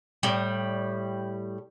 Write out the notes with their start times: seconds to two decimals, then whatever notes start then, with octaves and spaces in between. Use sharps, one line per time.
0.23 A2 G3